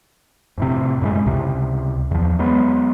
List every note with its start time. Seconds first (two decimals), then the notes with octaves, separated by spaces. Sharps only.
0.58 F2 A2 C3
1.01 F#2 A2 G#3
1.26 C#2 C3
2.11 E2 F3
2.39 F#3 G#3 B3